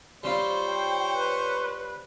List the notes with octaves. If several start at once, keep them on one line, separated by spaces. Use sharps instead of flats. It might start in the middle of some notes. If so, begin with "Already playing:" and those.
G3 C4 F4 C5 C#5
G5
B4